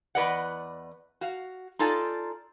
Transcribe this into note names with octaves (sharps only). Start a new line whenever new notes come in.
E2 G#3 B4 D5 D#5 F#5
F#4 F5
D#4 F4 A4 D5 G#5